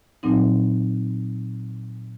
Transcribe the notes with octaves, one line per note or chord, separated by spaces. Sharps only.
A#2 F#3 C4 D#4